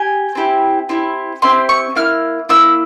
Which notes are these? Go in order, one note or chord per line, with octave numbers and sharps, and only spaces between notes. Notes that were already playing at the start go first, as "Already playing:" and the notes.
Already playing: G4 G#5
C4 E4 G4
C4 E4 G4
C4 E4 G4 C6
C#6
A#3 E4 F6
A#3 E4 E6